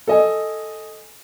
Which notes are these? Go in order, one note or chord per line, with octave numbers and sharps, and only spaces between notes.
A4 D#5 G#5